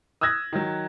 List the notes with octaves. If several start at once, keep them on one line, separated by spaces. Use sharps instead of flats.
D#6 E6 F#6 G#6 A#6
D#3 F#3